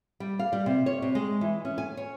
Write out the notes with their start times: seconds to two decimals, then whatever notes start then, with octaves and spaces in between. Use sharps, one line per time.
0.20 G3
0.39 F5
0.53 G3
0.66 C3
0.86 C#5
1.02 C3
1.15 G#3
1.41 E3
1.65 C#4
1.78 G#5
1.97 C#5